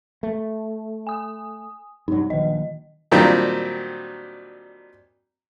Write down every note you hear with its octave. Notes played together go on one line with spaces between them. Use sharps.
A3
G#5 D#6
G2 C3 F#3 D#4
A#1 D#3 D#5
A#2 D#3 F#3 G3 C4 D4